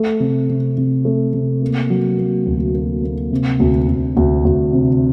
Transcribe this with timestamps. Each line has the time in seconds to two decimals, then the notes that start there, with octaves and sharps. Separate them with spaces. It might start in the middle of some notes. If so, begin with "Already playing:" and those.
Already playing: A3
0.20 C3
0.49 C3
0.77 C3
1.05 A3
1.33 C3
1.62 A#3
1.90 F#3
2.18 A#3
2.46 D2
2.75 A#3
3.03 A#3
3.32 C3
3.60 D2
3.88 D2
4.17 D2
4.45 D2
4.73 C3